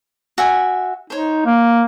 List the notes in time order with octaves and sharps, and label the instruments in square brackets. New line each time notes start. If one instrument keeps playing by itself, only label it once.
[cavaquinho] F#4 E5 G#5
[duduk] D#4 [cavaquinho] C5 C#5
[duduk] A#3